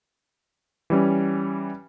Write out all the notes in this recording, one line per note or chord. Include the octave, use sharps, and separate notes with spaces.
E3 G3 C#4